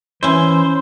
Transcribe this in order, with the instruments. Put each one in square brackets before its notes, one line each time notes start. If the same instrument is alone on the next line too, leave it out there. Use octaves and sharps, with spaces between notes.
[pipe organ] E3 [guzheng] C#4 E4 [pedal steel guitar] C5